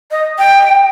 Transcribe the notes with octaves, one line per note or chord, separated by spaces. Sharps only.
D#5
G5